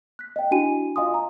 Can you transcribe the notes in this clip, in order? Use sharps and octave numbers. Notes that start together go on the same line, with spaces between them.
F#6 B6
D#5 F5 G5
D4 E4 F#4 G#5 D#7
F4 D#5 F5 G#5 C6 D#6
A#5